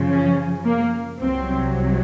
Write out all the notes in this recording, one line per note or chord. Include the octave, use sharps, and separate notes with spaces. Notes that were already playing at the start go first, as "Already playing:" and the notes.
Already playing: F#2 C#3 F3
C#4
A#3
C2 C3 F#3 C4